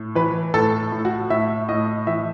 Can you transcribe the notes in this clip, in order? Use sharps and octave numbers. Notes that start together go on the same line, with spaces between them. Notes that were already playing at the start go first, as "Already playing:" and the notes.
Already playing: A2
E3 B4
A2 A4
A2
F#4
A2 E5
A2 D#5
E3 E5